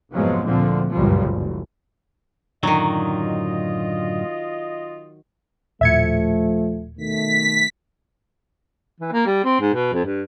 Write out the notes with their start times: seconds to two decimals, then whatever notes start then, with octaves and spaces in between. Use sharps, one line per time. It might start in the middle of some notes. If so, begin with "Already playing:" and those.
0.11 F1 G#2 F3 F#3 G#3 B3
0.45 D2 A#2 D3 F3 A3 C4
0.92 G1 C#2 F#2 A#2 F3 G3
1.32 F#1
2.63 F#2 A2 D3 D#3 F#3 F4 D#5
5.81 D#1 A2 F3 A3 E5 G#6 C#7
6.98 B2 D#3 A3 B6
9.00 E3
9.12 A#3
9.26 G3
9.44 C4
9.60 G#2
9.74 B2
9.93 F2
10.05 G2